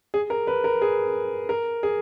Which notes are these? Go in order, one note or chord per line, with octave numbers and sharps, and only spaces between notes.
G#4
A#4
B4
A#4
G#4
A#4
G#4